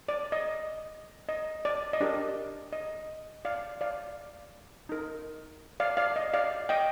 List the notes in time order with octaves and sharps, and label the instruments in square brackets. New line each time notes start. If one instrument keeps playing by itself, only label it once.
[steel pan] D5
D#5
D#5
D5
D#5
D4 G4 A#4 D5
D#5
D5 F5
D5 F5
D#4 A#4
D5 F5
D5 F5
D#5
D5 F5
D#5 G5